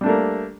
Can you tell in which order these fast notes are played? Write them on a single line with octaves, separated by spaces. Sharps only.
G3 D4 A3 A#3